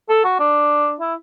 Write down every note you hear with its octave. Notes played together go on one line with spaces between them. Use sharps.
A4
F#4
D4
E4